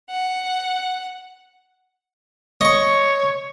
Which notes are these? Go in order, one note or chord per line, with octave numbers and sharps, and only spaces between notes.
F#5
C#5 D#5 C#6